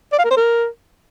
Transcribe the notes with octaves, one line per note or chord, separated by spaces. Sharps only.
D5
F5
A#4
C5
A#4